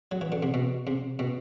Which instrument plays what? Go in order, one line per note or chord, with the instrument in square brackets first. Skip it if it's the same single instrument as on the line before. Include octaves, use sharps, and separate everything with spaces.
[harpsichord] F#3
E3
D3
C3
B2
C3
B2